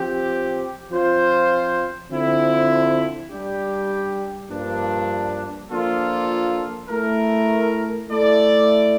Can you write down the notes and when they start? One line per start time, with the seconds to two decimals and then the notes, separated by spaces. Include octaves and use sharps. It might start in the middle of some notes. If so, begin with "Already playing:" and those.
Already playing: F3 C4 G4
0.91 F3 C4 F4 C5
2.10 D3 F3 C4 E4
3.30 G3 D4 G4
4.49 G2 F3 A#3 D4
5.69 F3 A#3 D4 F4 A4
6.88 A3 E4 A#4
8.09 A3 E4 A4 D5